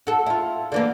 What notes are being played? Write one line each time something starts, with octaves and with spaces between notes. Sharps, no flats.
F#4 A4
E4 F4
D3 E3 A#3